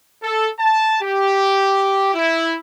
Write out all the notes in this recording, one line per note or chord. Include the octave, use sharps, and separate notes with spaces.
A4
A5
G4
E4